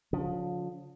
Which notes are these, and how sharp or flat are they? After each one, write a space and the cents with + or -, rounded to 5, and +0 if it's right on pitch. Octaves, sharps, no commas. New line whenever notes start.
D3 -45 F3 +30